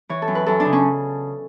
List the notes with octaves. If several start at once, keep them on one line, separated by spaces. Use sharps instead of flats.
E3 C#5
A4
F#2
B4
F#2 A4
D4
C#3
C#4